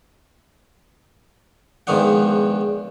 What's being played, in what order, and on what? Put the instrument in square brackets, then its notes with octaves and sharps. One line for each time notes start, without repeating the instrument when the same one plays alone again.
[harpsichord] E2 G#2 D#3 F3 D4 F#5